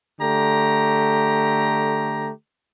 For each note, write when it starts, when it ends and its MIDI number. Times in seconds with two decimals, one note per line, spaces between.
0.20 2.31 50
0.20 2.31 57
0.20 2.31 67
0.20 2.31 82